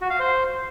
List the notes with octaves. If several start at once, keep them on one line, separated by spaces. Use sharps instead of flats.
F#4
F5
C5